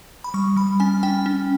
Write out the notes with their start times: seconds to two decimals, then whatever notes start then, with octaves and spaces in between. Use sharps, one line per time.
0.24 B5
0.34 G3 C#6
0.56 G3 B5
0.80 C#4 G#5
1.03 C#4 G5
1.26 C#4